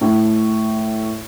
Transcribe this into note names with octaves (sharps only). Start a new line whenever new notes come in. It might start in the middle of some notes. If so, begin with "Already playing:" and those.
A2